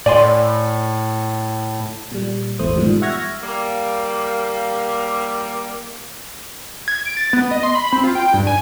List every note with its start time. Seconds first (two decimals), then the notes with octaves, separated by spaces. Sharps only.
0.06 A2 D5 G#5 C6
2.12 A#2 G3
2.59 G#1 E2 A3 C5 D#6
2.76 G#2 B2 D#3 F3 G3
3.01 E5 F#5 C#6 F6 G#6 A#6
3.43 G3 A#3
6.88 G#6
7.06 D7
7.17 A6
7.33 B3
7.51 D#5
7.63 C6
7.75 B5
7.93 C4
8.04 F4
8.15 G5
8.33 G2
8.47 G#5